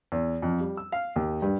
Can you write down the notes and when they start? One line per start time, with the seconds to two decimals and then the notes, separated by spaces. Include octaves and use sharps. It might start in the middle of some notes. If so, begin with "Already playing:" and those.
0.12 E2
0.42 F2
0.61 G3
0.77 E6
0.92 F5
1.16 D#2
1.42 G2